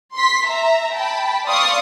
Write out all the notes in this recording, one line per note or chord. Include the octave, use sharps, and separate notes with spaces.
C6 B6
E5 A#5
G5 A5 B5
D5 F5 C6 C#6 D#6